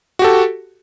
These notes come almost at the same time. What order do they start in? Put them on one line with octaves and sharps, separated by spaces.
F#4 G4 A4